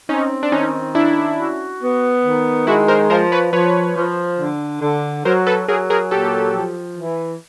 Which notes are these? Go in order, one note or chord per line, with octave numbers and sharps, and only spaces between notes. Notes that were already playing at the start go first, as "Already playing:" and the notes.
C4 C#4 D#4
D4
D#3 C#4 D#4
C#4 D4 E4
F#4
B3
D#3
G#3 E4 F#4
A#4 C5
F3 A#4 C5
B4 C#5
F3 B4 C#5
F3
D3
D3
F#3 A#4 C5
A4 B4
F#3 G#4 A#4
G#4 A#4
A#2 G4 A4
F3
E3